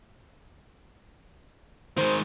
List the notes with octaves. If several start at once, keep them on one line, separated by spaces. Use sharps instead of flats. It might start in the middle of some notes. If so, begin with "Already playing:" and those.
D#3 G#3 C5